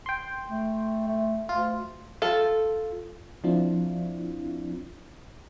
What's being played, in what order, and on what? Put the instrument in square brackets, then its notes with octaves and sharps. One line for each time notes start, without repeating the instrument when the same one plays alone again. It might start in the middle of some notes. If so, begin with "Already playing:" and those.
[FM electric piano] G5 C6
[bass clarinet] A3
A3
[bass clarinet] D2 [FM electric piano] F4
[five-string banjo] F4 A4
[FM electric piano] F3 C4 D4 E4 F4